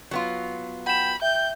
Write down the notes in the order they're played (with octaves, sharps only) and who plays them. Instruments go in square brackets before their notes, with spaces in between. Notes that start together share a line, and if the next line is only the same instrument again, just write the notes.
[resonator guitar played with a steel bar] F#3 B3 F4
[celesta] F#5 E7 [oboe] G5 [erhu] B5
[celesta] E5 [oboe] G5 [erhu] G6